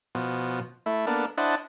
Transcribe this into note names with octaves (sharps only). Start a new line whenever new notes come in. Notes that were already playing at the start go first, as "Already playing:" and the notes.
B2 F3
A3 E4
A#3 B3 D4 A4
D4 E4 C5 D#5 F#5 A5